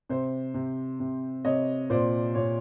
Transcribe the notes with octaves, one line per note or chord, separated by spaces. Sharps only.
C3 C5
C3
C3
C3 C#5 D#5
A#2 C5 D5
A#2 C#5